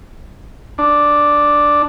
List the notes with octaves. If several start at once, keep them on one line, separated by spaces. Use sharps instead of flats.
D4